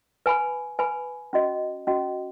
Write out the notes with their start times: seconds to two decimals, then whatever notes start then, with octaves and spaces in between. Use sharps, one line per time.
0.26 B4 G#5 B5
0.79 B4 G#5 B5
1.33 C#4 F#4 D#5
1.87 C#4 F#4 D#5